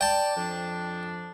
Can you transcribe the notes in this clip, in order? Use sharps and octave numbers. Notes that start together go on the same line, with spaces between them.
D5 G5 A5
F2 F3 D4